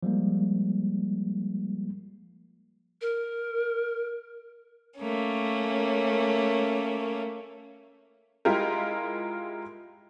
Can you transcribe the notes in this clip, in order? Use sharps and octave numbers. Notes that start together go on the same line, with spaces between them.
F3 G3 G#3 A#3
A#4
A3 A#3 C#4
G#3 E4 F4 G4 A#4